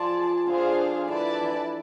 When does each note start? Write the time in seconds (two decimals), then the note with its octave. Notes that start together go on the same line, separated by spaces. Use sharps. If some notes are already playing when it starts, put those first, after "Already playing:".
Already playing: F3 G#4 D5 A5
0.47 D3 D4 F4 G#4 C5 F5
1.08 D3 E4 B4 D5 A5
1.40 E3